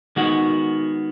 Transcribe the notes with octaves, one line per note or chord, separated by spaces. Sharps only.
D#3 G#3 B3 F#4